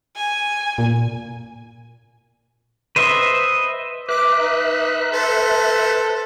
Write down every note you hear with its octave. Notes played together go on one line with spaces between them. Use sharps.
G#5
A#2
B4 C5 D#5 E5
B4 E5 D6 F#6
D#4
A4 C5